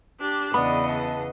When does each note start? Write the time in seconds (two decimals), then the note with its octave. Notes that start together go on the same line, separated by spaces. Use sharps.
0.20 D4 G4
0.54 E2 C#3 B3 D5 D#5 B5
0.89 A5